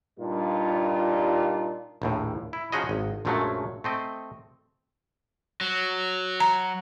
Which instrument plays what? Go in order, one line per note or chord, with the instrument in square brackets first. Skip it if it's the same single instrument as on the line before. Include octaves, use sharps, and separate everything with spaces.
[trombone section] G2 A#2 G3 D4 D#4 F4
[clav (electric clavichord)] A#1 D#2 A2
E4
F3 C#4 D#4 F#4 G#4 D#5
G#1
A#1 F#2 F3 F#3 G#3 A3
A3 C4 D#5
[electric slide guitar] F#3
[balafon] A#5